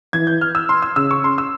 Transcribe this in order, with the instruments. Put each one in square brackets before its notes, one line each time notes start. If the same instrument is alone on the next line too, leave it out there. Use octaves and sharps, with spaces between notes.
[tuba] E3 [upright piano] G#6
[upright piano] G6
F6
E6
C6
E6
[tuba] C#3 [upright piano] E6
[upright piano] C#6
C6
E6